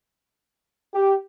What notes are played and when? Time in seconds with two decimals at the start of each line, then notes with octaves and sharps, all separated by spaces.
0.94 G4